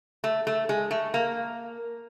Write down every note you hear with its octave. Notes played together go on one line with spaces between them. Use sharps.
A3
A3
G#3
A3
A#3